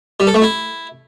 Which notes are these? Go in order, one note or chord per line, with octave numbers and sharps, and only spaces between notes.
G3
A4
A3
E4